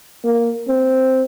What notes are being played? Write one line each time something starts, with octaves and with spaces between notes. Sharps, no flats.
A#3
C4